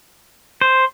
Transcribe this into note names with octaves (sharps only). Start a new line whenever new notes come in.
C5